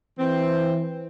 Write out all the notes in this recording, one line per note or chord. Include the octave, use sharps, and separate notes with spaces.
E3 C4